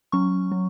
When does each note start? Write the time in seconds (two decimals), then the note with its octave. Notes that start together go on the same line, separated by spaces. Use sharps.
0.12 F#3 C#4 C#6
0.52 F#3